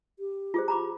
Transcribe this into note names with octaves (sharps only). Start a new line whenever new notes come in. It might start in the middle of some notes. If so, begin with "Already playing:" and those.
G4
F4 G#4 C5
A#5 B5 D6